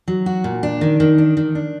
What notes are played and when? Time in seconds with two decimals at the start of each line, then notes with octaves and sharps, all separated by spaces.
0.08 F#3
0.26 F#4
0.44 A#2
0.63 D4
0.81 D#3
1.00 D#3
1.18 D4
1.37 D#3
1.55 D4